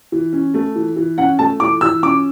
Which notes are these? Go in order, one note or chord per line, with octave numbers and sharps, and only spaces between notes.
E3
C#4
A3
E3
E3
C#4 F#5
A3 A5
E3 D6
E3 E6
C#4 D6